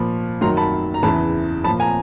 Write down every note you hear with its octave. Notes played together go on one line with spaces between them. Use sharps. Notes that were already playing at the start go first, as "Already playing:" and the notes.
Already playing: A#2 F3 B5
F#2 D#3 F#3 A#5 C6
A5 B5
A#5
E2 C#3 E3 A5 B5
A#2 F3 A5 B5
G#5 A#5